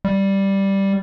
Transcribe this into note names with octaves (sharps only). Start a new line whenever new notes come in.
G3